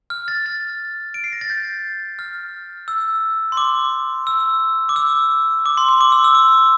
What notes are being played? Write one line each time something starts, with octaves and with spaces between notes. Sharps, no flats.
F6
A6
A6
D7
C7
A#6
A6
G6
F6
E6
C6
D6
E6
D6
E6
D6
C6
C6
D6
E6
E6
D6